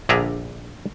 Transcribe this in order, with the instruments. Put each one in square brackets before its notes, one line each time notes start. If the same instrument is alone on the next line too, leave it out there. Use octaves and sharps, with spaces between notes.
[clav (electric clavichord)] A#1 D3 G#4 D5 E5 A#5